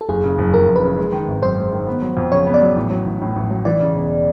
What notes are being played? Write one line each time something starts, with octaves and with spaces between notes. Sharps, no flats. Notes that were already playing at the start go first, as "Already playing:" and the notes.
A4
F#1 G#4
C#3
F#1
F2 A#4
F#1
B4
C#3
G#3
D#3
G#1
F#2 C5
G#3
D#3
B3
F#3
F2
C#3 C#5
B3
D5
F#3
A1
F#3
A1
A2
A1
F#3
E3 D5
C#3
E1